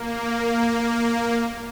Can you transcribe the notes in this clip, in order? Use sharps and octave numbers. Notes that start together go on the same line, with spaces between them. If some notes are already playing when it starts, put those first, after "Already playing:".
Already playing: A#3